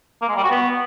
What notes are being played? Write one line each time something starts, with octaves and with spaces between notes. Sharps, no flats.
A#3
G#3
G3
F#4
B3